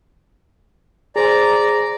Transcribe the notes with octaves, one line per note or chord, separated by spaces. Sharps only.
G#4 C5 D5 G#5 A#5